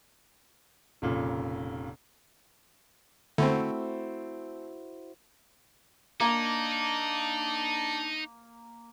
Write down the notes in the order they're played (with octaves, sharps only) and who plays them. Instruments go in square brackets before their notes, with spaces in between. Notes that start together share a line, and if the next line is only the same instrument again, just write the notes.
[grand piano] F1 A#2 C#3
[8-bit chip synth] D3 [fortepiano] A3 C4 [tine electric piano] E4 F#4 C5
[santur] A#3 [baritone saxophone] D4 [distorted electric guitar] D#4